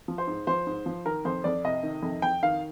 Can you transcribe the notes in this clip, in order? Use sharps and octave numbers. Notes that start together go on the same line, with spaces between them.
F3
C5
G#2
F3 C5
G#2
F3
D#3 A#4
F2 C5
F2 D5
C3 D#5
D#3
F2
F2 G5
D#3 F5